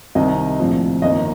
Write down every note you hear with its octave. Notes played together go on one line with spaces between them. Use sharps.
C2 C3 D#3 D#5
A#1 A2 F3 C4
G1 F2 D#3 A#3 D#5